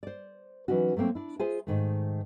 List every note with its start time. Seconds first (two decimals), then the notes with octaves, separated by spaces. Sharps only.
0.03 C5 D5
0.68 E3 F#3 C#4 D#4 F#4
0.96 F#3 A3 A#3 C4
1.15 D4 E4
1.39 F4 G#4 C5 E5 G#5
1.67 G#2 D#3 A3